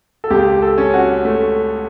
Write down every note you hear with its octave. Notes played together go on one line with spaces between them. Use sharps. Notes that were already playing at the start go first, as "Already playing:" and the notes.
A4
C#2 G4
A4
C#4
F#4
A3